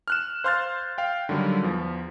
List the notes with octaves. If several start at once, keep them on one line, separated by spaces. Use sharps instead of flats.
F6 F#6 E7
C5 F5 C6 F6 G6 A6
F5 G5
D3 D#3 F#3 G3
E2 F3